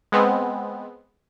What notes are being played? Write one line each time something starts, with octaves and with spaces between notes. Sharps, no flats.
G#3 B3 C4